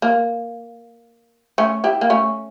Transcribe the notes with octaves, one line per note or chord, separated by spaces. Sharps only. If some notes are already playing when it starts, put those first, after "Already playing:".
A#3
A3 C#4
E4 G4
A#3
A3 C#4